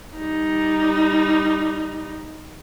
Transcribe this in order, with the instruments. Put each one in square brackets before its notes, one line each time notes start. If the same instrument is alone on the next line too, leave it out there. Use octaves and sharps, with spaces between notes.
[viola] G3 D#4